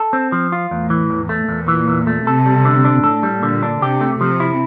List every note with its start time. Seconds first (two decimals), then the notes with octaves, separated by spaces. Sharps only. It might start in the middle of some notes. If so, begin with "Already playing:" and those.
Already playing: A4
0.13 C4
0.32 F3
0.52 F4
0.71 E2 A2
0.90 E3
1.10 E2
1.29 A3
1.49 E2 A#2
1.68 E3
1.88 E2
2.07 A3
2.26 C3 A4
2.46 G3
2.65 D3
2.85 D4
3.04 A2 A4
3.23 G3
3.43 A#2 D3
3.63 D4
3.82 C3 G4
4.01 A3
4.21 C3 F3
4.40 E4